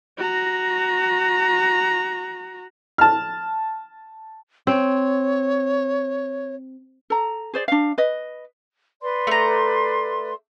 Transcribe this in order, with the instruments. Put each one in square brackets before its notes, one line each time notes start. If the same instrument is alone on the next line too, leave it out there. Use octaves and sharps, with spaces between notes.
[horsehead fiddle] F#4 A#5
[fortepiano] A5 F6
[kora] C4 [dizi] C#5
[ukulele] A4 A#5
G#4 C5 D5
D4 F5
B4 D#5
[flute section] B4 D5 C6
[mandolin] A3 A#5